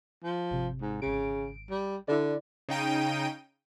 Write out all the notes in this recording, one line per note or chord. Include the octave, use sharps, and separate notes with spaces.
F3
G#1 C3
G#2
G#1 C#3 D7
G3
D3 E4 D5
C#3 D#4 G5 D#7